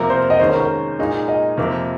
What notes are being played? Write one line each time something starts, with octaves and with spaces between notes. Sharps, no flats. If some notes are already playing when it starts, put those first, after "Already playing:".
Already playing: F2 C3 F3 A#3 F4 A#4
C5
D#5
D#2 D#3 G#3 C#4 C5
A#4
A#4
A#2 G#3 D#4
D#5
F2 C3 F3 A#3